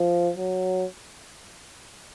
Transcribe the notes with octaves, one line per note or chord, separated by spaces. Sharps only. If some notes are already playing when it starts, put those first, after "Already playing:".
Already playing: F3
F#3